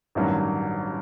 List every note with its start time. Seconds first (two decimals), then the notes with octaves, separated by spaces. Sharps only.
0.15 A1 G2 D#3 F#3